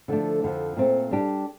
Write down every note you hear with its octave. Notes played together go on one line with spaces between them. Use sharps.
D3 F3 A3 D4
F2 D3 F3
A#2 A3 C4
G3 D4 G4